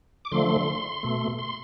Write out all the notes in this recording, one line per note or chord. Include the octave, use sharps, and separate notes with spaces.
D6
D3 F3 A3 C6
B2 A3
C6